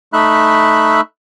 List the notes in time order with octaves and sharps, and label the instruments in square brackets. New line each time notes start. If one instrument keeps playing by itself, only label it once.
[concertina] A3 D#4 E5 B5 F#6